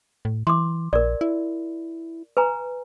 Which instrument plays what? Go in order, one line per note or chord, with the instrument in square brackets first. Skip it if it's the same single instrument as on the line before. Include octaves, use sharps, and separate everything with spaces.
[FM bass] A2
[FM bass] E3 [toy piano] C6 D6
[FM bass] A#1 [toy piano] A#4 D5
[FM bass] E4
[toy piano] B4 G#5 A#5